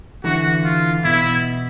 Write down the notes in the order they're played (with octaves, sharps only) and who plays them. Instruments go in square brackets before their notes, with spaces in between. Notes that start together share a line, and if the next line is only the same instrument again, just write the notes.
[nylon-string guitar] D3 E3 [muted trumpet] F#4
[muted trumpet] F4
[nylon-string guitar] B2 [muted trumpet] E4